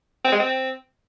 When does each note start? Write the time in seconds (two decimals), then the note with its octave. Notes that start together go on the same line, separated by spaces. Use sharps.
0.25 C4
0.32 G#3
0.40 C4